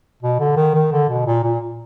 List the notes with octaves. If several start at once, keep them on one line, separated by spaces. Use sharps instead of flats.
B2
D3
D#3
D#3
D3
B2
A#2
A#2